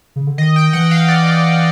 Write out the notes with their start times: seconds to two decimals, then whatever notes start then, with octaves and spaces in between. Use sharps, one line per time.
0.16 C#3
0.27 D3
0.37 D#3 D#5
0.56 G5
0.73 E3 F#5
0.91 F5
1.08 D5
1.27 D5